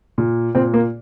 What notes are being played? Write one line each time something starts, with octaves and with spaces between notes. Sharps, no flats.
A#2
A#2 C4
A#3